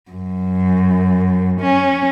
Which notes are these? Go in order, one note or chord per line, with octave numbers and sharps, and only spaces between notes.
F#2
C#4